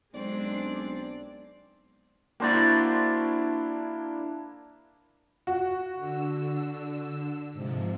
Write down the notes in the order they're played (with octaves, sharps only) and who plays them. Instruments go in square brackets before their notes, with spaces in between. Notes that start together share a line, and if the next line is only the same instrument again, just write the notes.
[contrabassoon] B1 [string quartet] G#3 C4 D4 [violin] D5
[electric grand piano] A#3 D4 E4 [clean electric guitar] F#4 C5 D5
[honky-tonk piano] F#4
[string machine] D3 E6
G#2 C3 F3